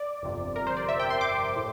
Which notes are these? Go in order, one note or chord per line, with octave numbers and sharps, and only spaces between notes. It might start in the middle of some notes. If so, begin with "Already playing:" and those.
Already playing: D5
G1 F2 C3
A#4
C5
D5
E5
G5
C6
D6
A2